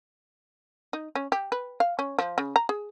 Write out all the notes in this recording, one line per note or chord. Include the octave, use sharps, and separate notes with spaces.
D#4
C#4
G4
B4
F5
C#4
F3
C#3
A#5
G#4